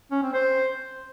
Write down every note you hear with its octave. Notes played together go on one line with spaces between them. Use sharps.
C#4
C4
C5